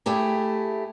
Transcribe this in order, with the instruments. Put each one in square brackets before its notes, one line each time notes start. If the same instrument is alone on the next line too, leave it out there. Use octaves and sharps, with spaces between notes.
[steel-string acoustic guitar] A3 E4 G4 G#4